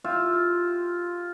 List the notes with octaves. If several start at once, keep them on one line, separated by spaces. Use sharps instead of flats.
F4 G4 E5